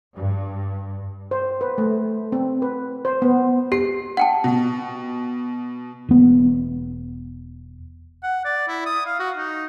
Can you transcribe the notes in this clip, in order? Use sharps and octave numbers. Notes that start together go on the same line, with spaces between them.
G2
C5
B4
A3
C4
B4
C5
B3
G4 C7
F#5 G5 A5
B2
E1 B3
F#5
D5
E4
D#6
F5
F#4
D#4